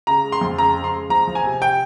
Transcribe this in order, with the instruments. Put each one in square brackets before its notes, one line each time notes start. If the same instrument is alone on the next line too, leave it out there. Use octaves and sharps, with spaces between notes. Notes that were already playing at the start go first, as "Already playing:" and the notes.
[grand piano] C#3 A#5
G#3
C6
F2
C#3 A#5
C#3
C6
G#3
F3 A#5
F3
G#5
C3
G5